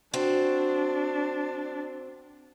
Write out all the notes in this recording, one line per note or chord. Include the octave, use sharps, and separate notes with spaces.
C4 D4 F#4